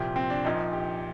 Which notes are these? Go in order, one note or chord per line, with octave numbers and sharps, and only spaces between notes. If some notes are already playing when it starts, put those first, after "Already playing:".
Already playing: C2 A#2 F3 G4
C4
D4
A#1 A#2 F3 D#4
G4